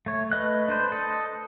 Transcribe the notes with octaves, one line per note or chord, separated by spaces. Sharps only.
A3 C#5
A3 B4 D#5 F#6
D4 B4 C5
A4 D#5